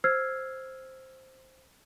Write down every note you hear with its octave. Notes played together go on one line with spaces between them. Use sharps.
C5 E6 F6 G#6 C7